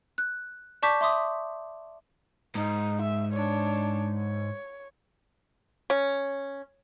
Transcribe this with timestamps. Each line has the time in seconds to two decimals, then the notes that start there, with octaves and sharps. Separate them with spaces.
0.18 F#6
0.82 D5 A5 C#6 D6 G6 B6
1.01 E5 C6 D6 D#6
2.55 G#2 D#4
3.02 E5
3.33 D4 C#5
4.15 C#5
5.90 C#4